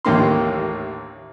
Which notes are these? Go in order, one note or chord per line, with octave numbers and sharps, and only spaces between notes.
A1 D#2 A2 A#3 D4 C6